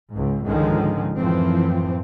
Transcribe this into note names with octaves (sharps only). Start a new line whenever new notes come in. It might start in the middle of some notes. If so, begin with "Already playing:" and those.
C#2 G#2
C#2 G#2 D3 D#3 F3 G#3
F#2 A2 E3 F3 C4